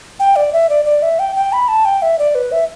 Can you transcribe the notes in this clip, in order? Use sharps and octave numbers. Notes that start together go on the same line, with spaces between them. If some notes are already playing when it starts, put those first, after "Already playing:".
G5
D5
E5
D5
D5
E5
G5
G5
B5
A5
G5
E5
D5
B4
E5